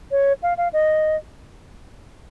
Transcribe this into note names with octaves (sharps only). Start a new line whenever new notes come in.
C#5
F5
F5
D#5